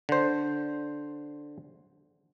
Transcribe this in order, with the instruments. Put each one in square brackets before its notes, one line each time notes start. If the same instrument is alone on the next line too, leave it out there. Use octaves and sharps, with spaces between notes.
[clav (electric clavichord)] D3 C5